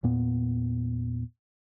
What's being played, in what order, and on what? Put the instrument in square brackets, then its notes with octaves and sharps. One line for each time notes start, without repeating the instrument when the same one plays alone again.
[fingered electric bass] E2 A#2 B3